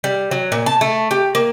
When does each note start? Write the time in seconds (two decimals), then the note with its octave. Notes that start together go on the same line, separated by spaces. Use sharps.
0.04 G3
0.31 F#3
0.52 A#2
0.66 A5
0.81 A3
1.11 G4
1.35 A#3